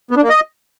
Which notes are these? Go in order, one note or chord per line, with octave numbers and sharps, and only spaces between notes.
B3
D4
A#3
D#5